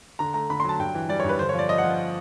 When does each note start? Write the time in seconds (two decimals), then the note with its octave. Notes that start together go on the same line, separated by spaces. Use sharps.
0.19 D3 A#5
0.34 A3 A#5
0.50 D3 B5
0.60 C6
0.64 F#3 A5
0.79 G2 G5
0.95 E3
1.09 G3 D5
1.20 C#5
1.24 G2
1.29 B4
1.39 D3 C5
1.49 C#5
1.54 F3 D5
1.69 F3 D#5
1.78 F#5
1.84 F3